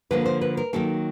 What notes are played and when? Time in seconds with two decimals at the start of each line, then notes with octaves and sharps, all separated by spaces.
0.11 D3 F3 A#3 B4
0.26 C5
0.41 B4
0.57 A#4
0.73 D#3 F#3 A#3 A4